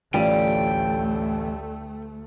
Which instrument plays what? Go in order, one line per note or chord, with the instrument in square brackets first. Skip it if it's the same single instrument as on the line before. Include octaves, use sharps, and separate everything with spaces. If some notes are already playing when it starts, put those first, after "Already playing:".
[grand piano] A1 F4 D#7 [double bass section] D2 A3 [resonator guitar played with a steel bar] G3 [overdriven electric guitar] G5